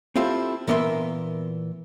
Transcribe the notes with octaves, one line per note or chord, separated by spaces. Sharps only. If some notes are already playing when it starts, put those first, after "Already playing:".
C4 E4 F4 G4 A4
A#2 E3 B3 A#4 E5 C6